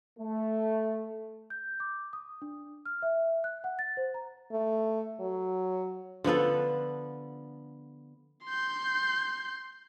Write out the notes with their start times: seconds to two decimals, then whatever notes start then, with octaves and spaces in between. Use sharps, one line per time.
0.19 A3
1.50 G6
1.80 D6
2.13 D#6
2.42 D4
2.86 F6
3.02 E5
3.44 F#6
3.64 F#5
3.79 A6
3.97 C5
4.14 A#5
4.52 A3
5.20 F#3
6.24 D3 F3 B3 A4
8.45 C6 G6